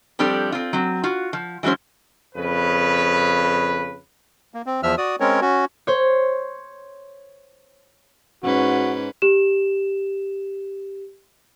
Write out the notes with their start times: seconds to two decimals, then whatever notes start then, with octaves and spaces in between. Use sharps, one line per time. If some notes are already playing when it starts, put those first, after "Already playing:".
0.19 F3 G3 C4 D4 A4 C5
0.52 C4 F4
0.73 F#3 C4
1.03 F4 F#4
1.33 F3
1.63 E3 F#3 G#3 C#4 C5
2.36 F2 C#3 B4
4.54 A#3
4.66 C4
4.83 E2 F3 E5 E6 F6
4.98 F#4 D5 D#6
5.20 G#3 C4 C#4 A#4 C#5
5.41 C#4 F#4
5.87 C5 C#5
8.43 G#2 C#4 F#4 B4
9.22 G4 E7